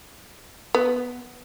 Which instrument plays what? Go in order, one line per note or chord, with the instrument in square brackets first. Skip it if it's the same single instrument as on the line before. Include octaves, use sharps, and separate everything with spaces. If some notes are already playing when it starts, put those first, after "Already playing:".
[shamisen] B3